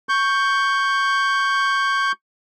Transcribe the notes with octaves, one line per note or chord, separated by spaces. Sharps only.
C#6 G6